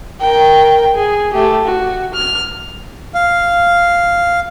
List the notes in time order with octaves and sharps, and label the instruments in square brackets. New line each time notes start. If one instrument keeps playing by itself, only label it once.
[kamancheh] A#4 G5
G#4
A3 G4
F#4
F6
[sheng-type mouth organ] F5